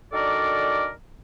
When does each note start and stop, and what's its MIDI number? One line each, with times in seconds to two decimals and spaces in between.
0.13 0.89 51
0.13 0.89 62
0.13 0.89 66
0.13 0.89 69
0.13 0.89 70
0.13 0.89 74